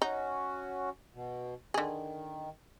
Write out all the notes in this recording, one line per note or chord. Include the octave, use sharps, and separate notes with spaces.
C#4 D#4 F#4
B2
D3 D#3 G#4